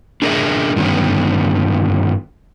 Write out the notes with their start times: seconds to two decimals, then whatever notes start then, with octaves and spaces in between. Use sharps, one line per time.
0.22 D4 G#4 A#4 B4 D#5 E5
0.76 G2 D3 D#3 B3 C#4